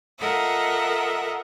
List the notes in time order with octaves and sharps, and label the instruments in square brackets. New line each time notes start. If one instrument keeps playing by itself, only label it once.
[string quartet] F4 A4 A#4 D#5 E5 F#5